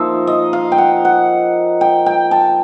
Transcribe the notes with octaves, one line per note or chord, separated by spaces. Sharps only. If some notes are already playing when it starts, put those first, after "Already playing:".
Already playing: F3 A#3 D#4 C5 E5
D#5
F5
G5
F#5
F#5
G5
G5
A5